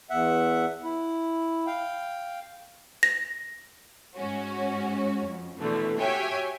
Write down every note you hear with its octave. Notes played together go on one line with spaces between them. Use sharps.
E2 E5 F#5
E4
F5 G5
A#6
G#2 C#4 F#4
F2
B2 D3 E3 A3
F#4 G4 C#5 E5 G5 G#5